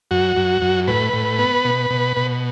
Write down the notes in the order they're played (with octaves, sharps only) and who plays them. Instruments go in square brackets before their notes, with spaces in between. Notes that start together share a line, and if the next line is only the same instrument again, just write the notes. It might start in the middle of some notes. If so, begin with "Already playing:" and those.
[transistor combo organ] F#2 F#4
F#2
F#2
A2 B4
A2
B3
B2
B2
B2